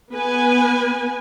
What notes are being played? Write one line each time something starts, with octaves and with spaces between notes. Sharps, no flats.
B3 B4 G#5